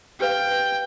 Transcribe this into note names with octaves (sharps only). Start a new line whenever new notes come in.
G4 B4 F5 G5